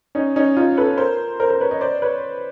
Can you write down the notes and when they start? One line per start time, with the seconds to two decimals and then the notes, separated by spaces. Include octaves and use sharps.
0.15 C#4 D#4
0.36 C#4 D#4
0.57 D#4 F4
0.77 A4 B4
0.98 A#4 C5
1.40 A#4 C5
1.50 A#4 C5
1.60 B4 C#5
1.71 C#5 D#5
1.81 C5 D5
2.02 B4 C#5